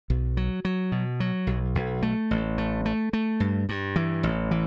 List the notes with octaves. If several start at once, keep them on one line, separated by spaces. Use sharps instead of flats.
B1
F#3
F#3
B2
F#3
B1
B1
A3
A1
A3
A3
A3
G2
G2
E3
A1
E3